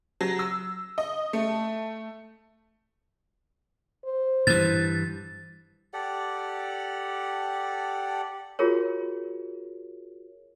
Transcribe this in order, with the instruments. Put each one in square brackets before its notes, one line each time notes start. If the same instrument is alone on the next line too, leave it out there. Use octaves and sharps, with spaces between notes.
[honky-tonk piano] F#3
E6
D#5
A3
[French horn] C5
[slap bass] G2 E3 [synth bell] A6
[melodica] G4 A4 D5 F#5
[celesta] F4 F#4 G#4 A#4 C#5